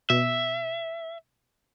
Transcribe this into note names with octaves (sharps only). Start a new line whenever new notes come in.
B2 E5